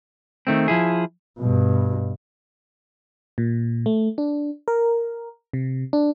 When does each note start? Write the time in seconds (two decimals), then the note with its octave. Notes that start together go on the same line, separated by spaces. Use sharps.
0.47 D#3 A3 C4
0.68 F3 E4 G#4
1.39 G2 B2
3.38 A#2
3.86 A3
4.18 D4
4.68 A#4
5.53 C3
5.93 D4